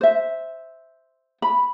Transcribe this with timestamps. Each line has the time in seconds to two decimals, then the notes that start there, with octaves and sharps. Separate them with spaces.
0.01 C5 E5
1.42 B5